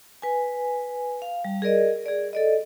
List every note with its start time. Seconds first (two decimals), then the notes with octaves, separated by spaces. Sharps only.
0.22 B4 G#5
1.22 F5
1.44 G3
1.62 G#4 A#4 D5 D#5
2.06 G#4 D5
2.33 A4 D5 D#5